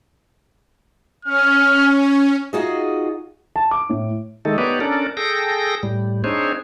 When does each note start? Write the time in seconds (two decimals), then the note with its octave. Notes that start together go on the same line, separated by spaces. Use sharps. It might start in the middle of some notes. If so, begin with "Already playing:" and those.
1.25 C#4 F6
2.53 D#4 F4 F#4 G#4 D#5
3.56 A5
3.71 D6
3.89 A2
4.45 D#3 G#3 A3 D#4 A4
4.58 B3 D#4 G4 B4 C#5 D5
4.80 C#4 D4 A4 A#4 D5
5.17 G#4 A4 G5 A#6
5.83 A2 G3
6.24 C4 D4 D#4 G#4 C5 C#5